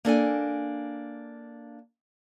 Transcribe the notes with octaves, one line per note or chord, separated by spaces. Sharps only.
A#3 D4 A4 G#5